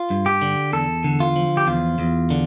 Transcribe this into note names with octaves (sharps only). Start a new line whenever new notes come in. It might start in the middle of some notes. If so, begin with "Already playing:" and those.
Already playing: F4
G2
G4
D3
E2 A4
D3
F4
F3
G4
E2 F4
E2
D3